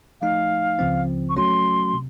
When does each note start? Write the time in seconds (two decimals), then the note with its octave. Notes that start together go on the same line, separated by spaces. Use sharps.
0.21 F3 A3 D#4 F5
0.79 C#2 C#3 F3 C4
1.29 C#6
1.36 F#3 A3 C#4 F#4 C6
1.94 C3